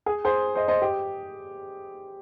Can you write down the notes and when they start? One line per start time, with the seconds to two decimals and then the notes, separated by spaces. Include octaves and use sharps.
0.06 G#4
0.25 G#4 C5
0.55 C5 D#5
0.68 C5 D#5
0.82 G4